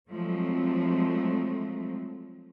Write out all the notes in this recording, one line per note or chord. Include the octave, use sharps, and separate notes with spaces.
F3 F#3 G#3 A3 C4